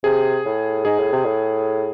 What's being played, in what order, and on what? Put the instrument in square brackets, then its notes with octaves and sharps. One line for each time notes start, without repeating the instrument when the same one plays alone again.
[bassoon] C3 [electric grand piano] G#4
[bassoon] A2
[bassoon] G#2 [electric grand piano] G#4
[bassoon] A2
C3
A2